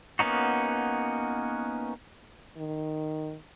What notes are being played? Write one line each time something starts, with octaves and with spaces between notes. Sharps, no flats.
A#3 B3 C#4 D#4 F#4
D#3